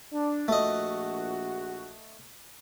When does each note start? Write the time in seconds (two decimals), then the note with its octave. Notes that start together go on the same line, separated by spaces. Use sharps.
0.13 D4
0.48 A#1 A3 F#4 D#5